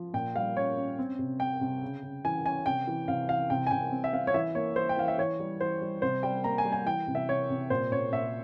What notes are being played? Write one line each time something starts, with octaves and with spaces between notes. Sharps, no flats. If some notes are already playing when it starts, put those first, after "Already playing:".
Already playing: F3
A#2 G5
G3 F5
C#4 C#5
C#4
C4
C3
C4 G5
C3
C#3
C#3
E3 G#5
C#4 G#5
C3 G5
E3
C3 F5
E3 F5
C3 G5
G#5
C3 G5
C4
E5
C4 F5
C#5
E3 E5
A#3 C#5
E3 C5
G5
E3 F5
E5
E3 C#5
G3
E3 C5
G3
C3 C5
G3 G5
A#3 A#5
G#5
G3
G#5
E3 G5
C3
E5
C3 C#5
C3
A#2 C5
A#2 C#5
A#2 E5